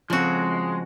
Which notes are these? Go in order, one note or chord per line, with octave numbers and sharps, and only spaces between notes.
C#3 F3 G#3 C4 F#4